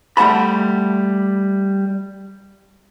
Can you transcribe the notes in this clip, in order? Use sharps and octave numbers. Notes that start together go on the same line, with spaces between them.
G3 A3 F#5 A5 B5